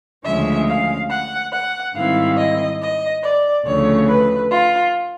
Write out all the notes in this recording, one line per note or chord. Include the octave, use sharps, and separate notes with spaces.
D2 C#3 F3 G#3 C#4 E5
F5
F#5
F#5
G#2 D#3 G3 C4 E4 F5
D#5
D#5
D5
D2 C#3 F3 A3 C#5
B4
F4